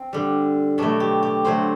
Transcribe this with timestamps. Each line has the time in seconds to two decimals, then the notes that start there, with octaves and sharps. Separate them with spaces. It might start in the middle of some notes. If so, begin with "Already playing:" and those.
Already playing: C4
0.13 D3 G3
0.78 B2 F#3 A3 D4
1.00 G4
1.23 G4
1.44 D3 F#3 A3 C5